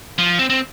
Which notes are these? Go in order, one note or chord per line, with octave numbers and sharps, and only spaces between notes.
F3
C4
C4